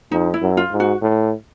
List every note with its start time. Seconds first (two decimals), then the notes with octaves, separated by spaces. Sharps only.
0.12 F2 D#4
0.34 E4
0.42 F#2
0.57 F4
0.72 G#2
0.80 F#4
1.02 A2